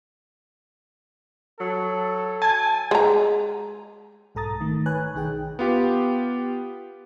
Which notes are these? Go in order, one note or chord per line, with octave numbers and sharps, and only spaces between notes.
F#3 A4
G#5 A5
G#3 A#5
B1 G#2 A4 A#5 D#6 A6
D#3 A3
B4 C#5 G#5 F#6
B1 D#3 D#4 G#4 G5
B3 F4 G4